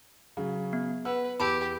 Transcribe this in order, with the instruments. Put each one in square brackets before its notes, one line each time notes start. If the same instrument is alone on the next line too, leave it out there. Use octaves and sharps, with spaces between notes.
[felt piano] C#3 F#3
[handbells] B3
[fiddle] B4 [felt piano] F#5 E6
[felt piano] E2 [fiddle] G4 [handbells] B4 A5 B5